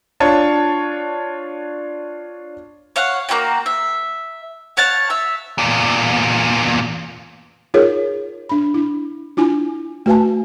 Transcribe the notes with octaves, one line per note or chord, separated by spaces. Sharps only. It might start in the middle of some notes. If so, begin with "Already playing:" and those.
D4 F4 C#5 A5
C#5 F5 F#5
A#3 E4 F#4 G5
E5
C#5 F5 F#5 A5
E5
E2 A#2
D#4 F4 G#4 A#4 C#5
D4 B5
D4 E4
D4 E4 F4 G#5
A3 F#4 B4 F5 G#5 A5